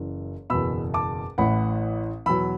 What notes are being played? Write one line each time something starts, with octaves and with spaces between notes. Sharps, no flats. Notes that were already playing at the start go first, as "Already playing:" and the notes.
Already playing: F#1 F#2 E3
F#1 E2 B2 B5 E6
A5 D6
A1 A2 E3 F#5 B5
E2 B2 F#3 B5 E6